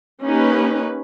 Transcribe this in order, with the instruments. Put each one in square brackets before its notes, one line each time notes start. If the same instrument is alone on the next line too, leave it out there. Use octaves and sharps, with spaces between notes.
[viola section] A#3 C#4 D#4 G4 B4